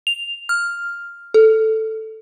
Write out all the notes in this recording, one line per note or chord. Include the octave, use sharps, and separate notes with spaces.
F7
F6
A4